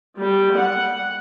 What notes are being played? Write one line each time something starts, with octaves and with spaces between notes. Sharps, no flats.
G3
F#5